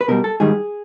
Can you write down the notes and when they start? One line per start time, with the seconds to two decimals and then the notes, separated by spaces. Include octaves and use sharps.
0.01 B4
0.08 B2 G3 A#4
0.24 A4
0.40 G#2 D#3 G3 G#4